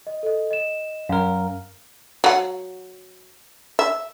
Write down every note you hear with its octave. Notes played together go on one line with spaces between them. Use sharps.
D#5
A4 D#5
D#5 E7
F#2 A#4 F5
F#3 F#5
E5